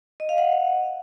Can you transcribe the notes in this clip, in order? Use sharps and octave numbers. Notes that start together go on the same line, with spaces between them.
D#5
F5
F#5